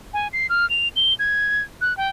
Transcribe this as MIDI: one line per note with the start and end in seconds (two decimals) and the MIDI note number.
0.14 0.28 80
0.33 0.47 96
0.49 0.68 89
0.70 0.88 101
0.96 1.14 103
1.19 1.63 92
1.81 1.96 90
1.97 2.09 79